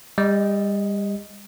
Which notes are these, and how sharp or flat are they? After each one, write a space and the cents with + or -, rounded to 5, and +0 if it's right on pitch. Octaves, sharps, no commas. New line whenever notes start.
G3 +35 D#5 +5